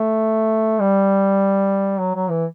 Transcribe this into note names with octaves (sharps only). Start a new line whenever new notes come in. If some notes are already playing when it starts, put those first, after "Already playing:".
Already playing: A3
G3
F#3
F#3
E3